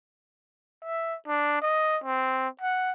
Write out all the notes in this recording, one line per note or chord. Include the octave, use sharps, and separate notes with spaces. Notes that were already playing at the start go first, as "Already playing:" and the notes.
E5
D4
D#5
C4
F#5